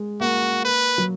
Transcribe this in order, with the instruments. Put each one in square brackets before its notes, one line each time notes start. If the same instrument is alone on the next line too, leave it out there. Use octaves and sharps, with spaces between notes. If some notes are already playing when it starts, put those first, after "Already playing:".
Already playing: [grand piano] G#3
[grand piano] A#3 [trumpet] F#4
[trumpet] B4
[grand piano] F#3